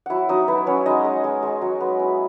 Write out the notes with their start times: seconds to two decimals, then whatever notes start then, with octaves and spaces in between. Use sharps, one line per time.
0.06 F#3 E4 E5 F#5
0.29 F#3 D#4 D#5
0.48 B3 E4 B4
0.66 F#3 C#4 C#5
0.86 G#3 D#4 D#5
1.04 G#3
1.24 G#3
1.42 G#3
1.62 F#3
1.80 B3
1.99 E4